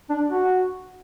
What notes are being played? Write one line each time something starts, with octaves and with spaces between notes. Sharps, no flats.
D4
F#4